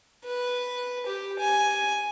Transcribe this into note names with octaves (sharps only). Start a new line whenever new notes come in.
B4
G4
G#5